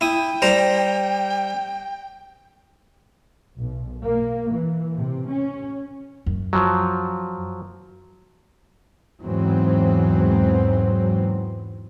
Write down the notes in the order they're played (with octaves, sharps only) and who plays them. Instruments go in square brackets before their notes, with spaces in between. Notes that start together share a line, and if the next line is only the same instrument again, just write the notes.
[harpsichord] E4 D#6 [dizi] G5
[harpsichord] G3 C5 A#5
[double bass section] B1
A#3
E3
C3
C#4
[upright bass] F#2
[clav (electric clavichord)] F3 F#3
[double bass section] E2 G#2 E3 F#3 C4